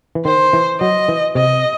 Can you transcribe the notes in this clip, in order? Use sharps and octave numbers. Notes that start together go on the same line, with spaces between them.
E3
D#3 C5
E3
F#3 D#5
E3
C3 D#5